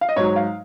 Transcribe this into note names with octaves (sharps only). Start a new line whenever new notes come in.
F5
D#5
G#2 F#3 C#5
F5